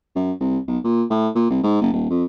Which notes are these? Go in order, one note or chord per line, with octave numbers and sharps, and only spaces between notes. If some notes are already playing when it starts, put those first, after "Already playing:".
F#2
C2
B1
A#2
A2
A#2
C2
G#2
F#1
D#1
F2